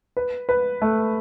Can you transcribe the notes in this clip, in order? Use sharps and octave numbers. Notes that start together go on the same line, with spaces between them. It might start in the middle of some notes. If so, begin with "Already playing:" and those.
B4
B4
A3